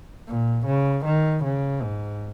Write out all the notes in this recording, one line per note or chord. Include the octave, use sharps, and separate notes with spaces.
A#2
C#3
D#3
C#3
G#2